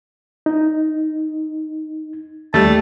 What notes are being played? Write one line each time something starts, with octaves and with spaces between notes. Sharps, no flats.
D#4
D#2 G3 A3 A5